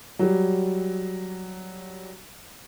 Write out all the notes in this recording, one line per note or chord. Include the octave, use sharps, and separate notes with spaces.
F#3 G3